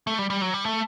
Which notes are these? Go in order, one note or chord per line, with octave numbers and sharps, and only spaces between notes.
A3
G3
G3
F#3
G3
A3